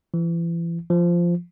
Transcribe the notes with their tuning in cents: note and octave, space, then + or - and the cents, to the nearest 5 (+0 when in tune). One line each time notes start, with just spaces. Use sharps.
E3 +35
F3 -10